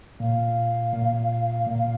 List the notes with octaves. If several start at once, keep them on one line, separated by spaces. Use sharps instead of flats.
A#2 F5
A#2
A#2